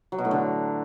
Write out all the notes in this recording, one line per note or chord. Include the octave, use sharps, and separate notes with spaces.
F#3
B2
A2
D3